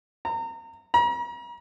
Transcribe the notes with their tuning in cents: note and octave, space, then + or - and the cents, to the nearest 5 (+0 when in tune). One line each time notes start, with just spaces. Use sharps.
A#5 -30
A#5 +40